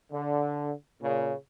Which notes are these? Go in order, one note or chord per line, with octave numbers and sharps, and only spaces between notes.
D3
A#2 C#3